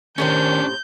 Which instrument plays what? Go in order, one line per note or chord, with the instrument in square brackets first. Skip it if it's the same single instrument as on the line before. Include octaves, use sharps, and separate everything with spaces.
[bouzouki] A2 C3 C5 [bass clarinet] D#3 [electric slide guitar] C#4 D4 [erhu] G6